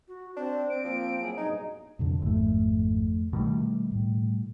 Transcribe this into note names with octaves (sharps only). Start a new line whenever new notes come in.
F#4
C4 D4 C5
C4 D7
F3 A#3
F#3 A#3 E4 G#4
G2 B2 D#4 G#4
F2 B2 D3
G#1 F2 A3
B2 D#3 G3 A3
A2